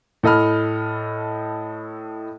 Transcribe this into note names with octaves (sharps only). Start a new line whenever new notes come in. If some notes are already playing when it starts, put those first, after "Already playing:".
A2 A4 D#5 B5 F6